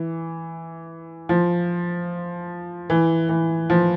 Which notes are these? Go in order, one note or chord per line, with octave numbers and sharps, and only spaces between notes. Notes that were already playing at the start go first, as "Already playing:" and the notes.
Already playing: E3
F3
E3
E3
F3